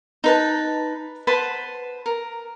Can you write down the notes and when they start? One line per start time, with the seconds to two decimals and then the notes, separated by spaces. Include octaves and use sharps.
0.24 D#4 B4 A5
1.27 B4 C5 F#5 A5
2.06 A#4